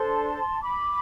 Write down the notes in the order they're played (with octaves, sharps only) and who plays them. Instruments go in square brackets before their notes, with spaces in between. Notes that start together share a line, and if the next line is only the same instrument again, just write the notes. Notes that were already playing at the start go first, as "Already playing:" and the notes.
Already playing: [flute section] D4 A4 C5 A5 C6
B5 D6